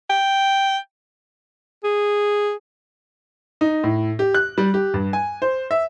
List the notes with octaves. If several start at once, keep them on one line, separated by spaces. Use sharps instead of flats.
G5
G#4
D#4
A2
G4
F#6
G3
G4
G2
G#5
C5
E5